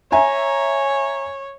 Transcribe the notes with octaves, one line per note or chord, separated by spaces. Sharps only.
C#5 E5 G#5 A#5